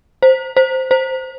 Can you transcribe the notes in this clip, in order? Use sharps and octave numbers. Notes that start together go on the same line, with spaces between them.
C5
C5
C5